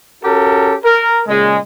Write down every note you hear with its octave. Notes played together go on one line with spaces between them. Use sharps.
C#4 F#4 G4 A4 A#4
A#4
A#2 C#3 G#3